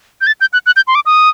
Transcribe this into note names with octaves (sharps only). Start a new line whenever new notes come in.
G6
A6
G6
F#6
F#6
G6
C6
D6
D#6